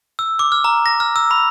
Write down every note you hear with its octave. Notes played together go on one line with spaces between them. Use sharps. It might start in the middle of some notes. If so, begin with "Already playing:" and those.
E6
D6
F6
A#5
A#6
F6
E6
B5